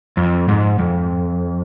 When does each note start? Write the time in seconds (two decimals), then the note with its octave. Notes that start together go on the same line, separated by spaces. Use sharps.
0.17 F2
0.48 G#2
0.79 F2